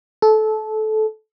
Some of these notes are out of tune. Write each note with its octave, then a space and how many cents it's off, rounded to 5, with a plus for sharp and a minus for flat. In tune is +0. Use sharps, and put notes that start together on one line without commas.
A4 -20